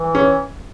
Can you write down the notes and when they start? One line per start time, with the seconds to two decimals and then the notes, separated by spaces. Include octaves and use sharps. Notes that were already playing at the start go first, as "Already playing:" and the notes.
Already playing: E3
0.15 C#4